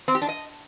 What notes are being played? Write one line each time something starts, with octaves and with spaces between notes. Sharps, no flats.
C4
G4
D4
D#5